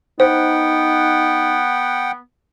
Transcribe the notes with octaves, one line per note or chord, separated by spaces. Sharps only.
B3 D#4 C5 F#5 G5